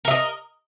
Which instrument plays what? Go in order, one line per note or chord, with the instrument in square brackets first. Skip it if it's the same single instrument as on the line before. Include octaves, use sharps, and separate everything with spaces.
[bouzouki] A#4
E5
D#5